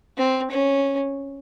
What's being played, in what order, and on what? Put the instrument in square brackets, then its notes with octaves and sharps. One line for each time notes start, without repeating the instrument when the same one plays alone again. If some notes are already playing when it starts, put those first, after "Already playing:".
[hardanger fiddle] C4
C#4